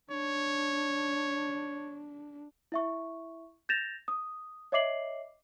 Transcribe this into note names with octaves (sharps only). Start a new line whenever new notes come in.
D4 C#5
E4 E5 C#6
G6 A6 A#6 E7 F7
D#6
C#5 D#5 E5 D6 C7 F#7